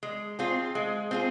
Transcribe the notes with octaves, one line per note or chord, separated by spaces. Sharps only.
G#3
C4 F4 G#4
G#3
C4 F4 G#4